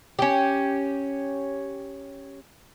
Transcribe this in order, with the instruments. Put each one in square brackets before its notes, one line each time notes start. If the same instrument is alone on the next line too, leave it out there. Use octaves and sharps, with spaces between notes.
[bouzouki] C#4 G4